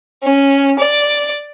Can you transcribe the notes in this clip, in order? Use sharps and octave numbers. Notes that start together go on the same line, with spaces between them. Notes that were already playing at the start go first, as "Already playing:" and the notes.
C#4
D5